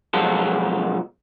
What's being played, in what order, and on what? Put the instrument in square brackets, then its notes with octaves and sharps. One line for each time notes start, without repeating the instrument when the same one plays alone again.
[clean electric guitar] B1 F3 G#3 F4 F#4 A4